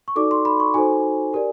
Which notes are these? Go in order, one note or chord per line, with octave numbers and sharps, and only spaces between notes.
C#6
D#4 F#4 A4 D5 D6
C6
B5
C#6
D#4 F#4 A4 C5 G#5
G4 A#4 D5